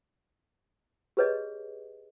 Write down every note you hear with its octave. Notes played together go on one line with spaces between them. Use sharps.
G4 G#4 B4 C#5 D#5